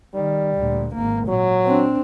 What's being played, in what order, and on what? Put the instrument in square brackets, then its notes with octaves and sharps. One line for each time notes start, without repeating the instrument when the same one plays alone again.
[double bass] D#3 [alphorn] G3
[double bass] D2 A#2
G#1 A#3
[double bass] A#2 [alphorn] F#3
[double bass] C4 D4